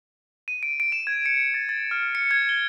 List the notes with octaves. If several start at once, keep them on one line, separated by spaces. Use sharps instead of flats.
D#7
D7
D7
E7
G#6
C#7
A6
A6
F6
C#7
G#6
G7